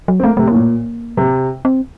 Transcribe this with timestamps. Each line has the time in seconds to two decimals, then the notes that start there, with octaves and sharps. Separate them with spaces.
0.08 F#3
0.20 C4
0.24 A3 A#3
0.37 C3 A3
0.48 A2 A#3
0.54 A#2
1.17 C3
1.65 C4